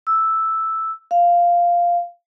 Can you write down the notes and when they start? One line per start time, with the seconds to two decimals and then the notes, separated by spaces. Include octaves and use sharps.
0.07 E6
1.11 F5